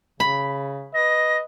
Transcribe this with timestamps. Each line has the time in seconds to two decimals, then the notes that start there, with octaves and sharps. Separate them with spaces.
0.20 C#3 B5
0.95 B4 D#5 A#6